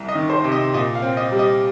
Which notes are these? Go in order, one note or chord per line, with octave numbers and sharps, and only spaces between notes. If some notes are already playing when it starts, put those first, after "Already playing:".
Already playing: C2
D#5
D#3
C5
C3
D#5
A#2 D#5
F5
C4
D#5
G3
D#5